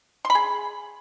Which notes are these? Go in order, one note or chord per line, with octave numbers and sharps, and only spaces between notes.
C6
B5
G#4